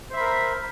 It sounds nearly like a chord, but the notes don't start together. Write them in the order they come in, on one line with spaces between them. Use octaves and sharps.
C5 E5 B5 A#4